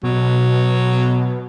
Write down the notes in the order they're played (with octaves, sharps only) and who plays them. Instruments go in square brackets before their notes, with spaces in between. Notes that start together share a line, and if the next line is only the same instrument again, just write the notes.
[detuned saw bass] B2 [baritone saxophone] F#3